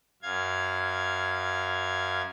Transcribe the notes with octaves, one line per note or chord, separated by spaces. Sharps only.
F#2 F5 G#6